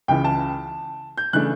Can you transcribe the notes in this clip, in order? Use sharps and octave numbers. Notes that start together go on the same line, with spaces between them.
C#2 C#3 E3 G5
A5
G6
C#3 E3 A3 D4 F#6